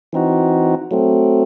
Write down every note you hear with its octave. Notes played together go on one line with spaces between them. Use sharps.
E3 C4 D#4 F#4
F#3 A3 C4